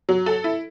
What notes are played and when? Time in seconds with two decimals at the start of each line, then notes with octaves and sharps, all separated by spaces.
0.09 F#3
0.26 A4
0.44 E4